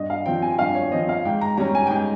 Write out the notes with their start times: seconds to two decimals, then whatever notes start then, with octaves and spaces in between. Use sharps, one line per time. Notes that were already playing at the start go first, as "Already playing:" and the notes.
Already playing: G2 D#5
0.10 F5
0.26 F3 C4 G5
0.42 G#5
0.50 G5
0.59 G2 F5
0.75 C#5
0.91 F3 C4 D#5
1.09 F5
1.25 G#2 G5
1.41 A#5
1.58 G3 C#4 A#5
1.75 G#5
1.87 G5
1.90 G#2 G#5